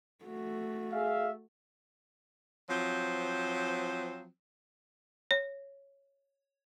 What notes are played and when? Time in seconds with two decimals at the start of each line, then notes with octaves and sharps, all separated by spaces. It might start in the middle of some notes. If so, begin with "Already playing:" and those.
0.25 A3 F#4
0.93 G#4 E5 F5
2.70 F3 F#3 C4
5.31 C#5